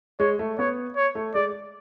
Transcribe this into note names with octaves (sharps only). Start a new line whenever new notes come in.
G#3 C#5
A3
B3 C#5
C#5
A3
G#3 D5